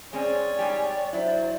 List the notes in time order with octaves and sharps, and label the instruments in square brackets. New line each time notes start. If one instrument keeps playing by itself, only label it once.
[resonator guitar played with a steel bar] G#3 C4 C#4 [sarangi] C#5 [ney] D5 [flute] G#5
[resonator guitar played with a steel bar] G#2 G3 G4
[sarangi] F#3 [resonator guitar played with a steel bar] E4 [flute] C5